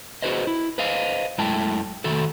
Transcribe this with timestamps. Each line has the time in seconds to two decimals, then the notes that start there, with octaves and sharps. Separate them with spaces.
0.22 F#4 G#4 B4 C5 D#5
0.47 E4
0.78 B4 C5 D#5 F5
1.38 F#2 G#3 A3 E4 G5 A5
2.04 D#3 A3 F#4 A4